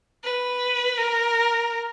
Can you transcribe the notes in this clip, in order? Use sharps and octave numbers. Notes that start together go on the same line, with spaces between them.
B4
A#4